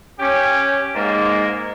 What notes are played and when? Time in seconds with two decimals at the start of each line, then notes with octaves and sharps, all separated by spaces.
0.19 C#4 G4
0.95 G#2 A#3